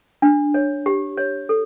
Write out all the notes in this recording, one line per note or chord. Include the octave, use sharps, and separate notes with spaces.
D4
C#5
G4
C#5
A4